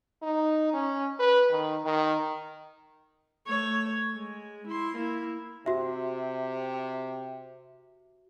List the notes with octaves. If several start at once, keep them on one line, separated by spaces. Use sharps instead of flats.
D#4
C#4
B4
D#3
D#3
A3 C#5
G#3
E4 C6
A#3 E4
C3 F#4 E5